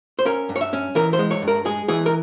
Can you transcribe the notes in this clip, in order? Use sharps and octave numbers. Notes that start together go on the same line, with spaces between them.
C5
C#4 A#4
G2
C#5
E5
C#4
E3 A#4
C5
G#3
C#5
G2
A#4
G#3 G#4
E3 G#4
A#4